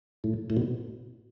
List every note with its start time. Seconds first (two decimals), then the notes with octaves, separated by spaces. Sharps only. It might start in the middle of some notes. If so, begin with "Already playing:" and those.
0.24 A2
0.50 A2
0.57 B2